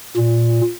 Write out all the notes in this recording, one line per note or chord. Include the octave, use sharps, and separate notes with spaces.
A#2